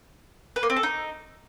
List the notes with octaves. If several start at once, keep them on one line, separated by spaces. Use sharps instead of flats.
B4
A#3
C4
A4
D#4